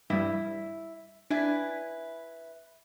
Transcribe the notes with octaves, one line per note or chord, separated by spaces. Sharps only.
G2 G3 E4
D4 E4 B4 G#5